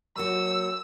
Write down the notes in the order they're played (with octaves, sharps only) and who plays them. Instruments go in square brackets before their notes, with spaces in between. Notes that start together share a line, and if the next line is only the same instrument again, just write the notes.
[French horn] F#3 [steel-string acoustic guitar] A#3 F#4 [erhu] E6